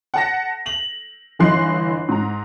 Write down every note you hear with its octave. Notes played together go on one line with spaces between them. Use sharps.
F#5 A5 A#6
F7 F#7
G1 E3 D#4 C6 F#6 C7
G#2 A#5